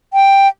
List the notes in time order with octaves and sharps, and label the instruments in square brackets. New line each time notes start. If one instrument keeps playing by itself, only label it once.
[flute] G5